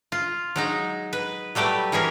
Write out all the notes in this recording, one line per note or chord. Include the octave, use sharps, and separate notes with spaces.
F4
F#3 G#3 D#4
B4
F#3 G3 A3 G4 B4
E3 C#4 G#4 A#4